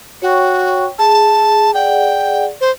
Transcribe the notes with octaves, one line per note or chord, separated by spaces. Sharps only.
F#4 C#5 G5 C#6
G#4 A5
G#4 D5 F#5 G5
C5